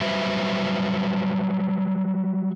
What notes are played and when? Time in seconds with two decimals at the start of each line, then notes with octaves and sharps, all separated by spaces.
0.01 F#3 G3 B4 C5 E5